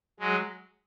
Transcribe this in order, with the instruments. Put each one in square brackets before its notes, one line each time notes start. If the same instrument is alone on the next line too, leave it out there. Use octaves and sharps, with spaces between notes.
[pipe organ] F#3 G#3